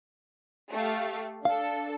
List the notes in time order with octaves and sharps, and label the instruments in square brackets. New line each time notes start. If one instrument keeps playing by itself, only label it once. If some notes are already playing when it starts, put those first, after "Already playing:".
[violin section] A3 G4 F5
[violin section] D4 A4 [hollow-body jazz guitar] F5